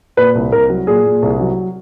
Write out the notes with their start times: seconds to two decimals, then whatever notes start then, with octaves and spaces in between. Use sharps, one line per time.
0.17 A#2 B4
0.35 C2
0.52 C2 A#4
0.70 F#3
0.87 A#2 G#4
1.05 A#2
1.22 C2
1.40 F#3